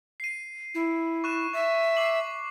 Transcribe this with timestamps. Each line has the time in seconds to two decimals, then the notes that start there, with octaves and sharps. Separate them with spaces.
0.20 C7 D#7
0.75 E4
1.24 C#6 F#6 E7
1.53 E5 C#6
1.97 D6 C7 F#7